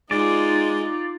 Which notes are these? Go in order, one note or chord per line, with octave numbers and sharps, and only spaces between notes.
G#3 D#4 F4 D5